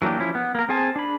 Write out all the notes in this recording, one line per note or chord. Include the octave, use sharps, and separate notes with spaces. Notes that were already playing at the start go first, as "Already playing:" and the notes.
E3 F#3 A#3 D4 G4
F3 C#4 E4
B3
A#3 A#4
C4 G#4 C5 G#5 A5
D4 B5